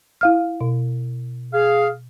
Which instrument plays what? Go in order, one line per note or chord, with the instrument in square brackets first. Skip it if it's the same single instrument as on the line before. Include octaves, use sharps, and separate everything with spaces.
[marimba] E4 F5 F6
B2
[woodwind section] G#4 F5